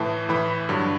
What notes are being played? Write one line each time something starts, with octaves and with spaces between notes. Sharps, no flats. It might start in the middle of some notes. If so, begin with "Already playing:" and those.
Already playing: A2 E3 A5
A2 E3 B5
G2 D3 F#3